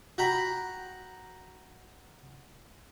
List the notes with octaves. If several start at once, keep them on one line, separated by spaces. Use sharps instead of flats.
F#4 G5 A#5 B5